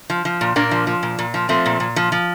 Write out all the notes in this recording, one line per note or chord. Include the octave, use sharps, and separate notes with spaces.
F3
F3
A#2
A#2 A#3 D4
F3
F3
A#2
A#2
F3
F3 A3 C4
A#2
A#2
F3
F3